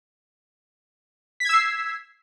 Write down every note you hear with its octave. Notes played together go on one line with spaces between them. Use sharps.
E6 G#6 B6 C7